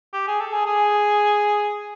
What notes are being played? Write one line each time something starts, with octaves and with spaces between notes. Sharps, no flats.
G4
G#4
A4
G#4
G#4